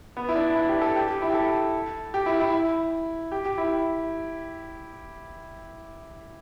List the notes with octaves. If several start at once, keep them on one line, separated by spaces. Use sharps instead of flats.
B3
E4
D4
E4
G4
A4
G4
G4
E4
G4
A4
G4
E4
E4
E4
G4
G4
E4